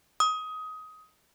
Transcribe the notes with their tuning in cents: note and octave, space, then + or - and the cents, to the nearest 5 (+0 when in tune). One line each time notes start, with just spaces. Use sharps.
D#6 +20